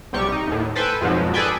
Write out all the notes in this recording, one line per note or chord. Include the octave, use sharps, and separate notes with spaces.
B1 C3 G3 G4 C#6
D#4
D#2 A2
A4 B4 C5 G5 G#5
F2 G#2 B2 F3 F#3
G#4 A4 B4 D5 G5 G#5